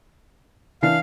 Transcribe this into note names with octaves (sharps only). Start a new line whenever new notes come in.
E3 D4 F5 C7